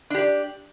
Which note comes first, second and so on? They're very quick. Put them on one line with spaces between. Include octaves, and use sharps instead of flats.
D4 G4 D5